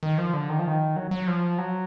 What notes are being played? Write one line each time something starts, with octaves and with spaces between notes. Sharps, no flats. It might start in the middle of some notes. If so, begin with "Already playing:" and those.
D#3
F3
D3
D#3
F3
D#3
F#3
F#3
F3
F#3